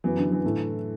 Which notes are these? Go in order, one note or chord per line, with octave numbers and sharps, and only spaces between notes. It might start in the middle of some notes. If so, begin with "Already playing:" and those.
F#2 E3 F#3 B3
D3
E3
A2 A3 E4